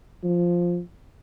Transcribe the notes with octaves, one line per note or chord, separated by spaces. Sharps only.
F3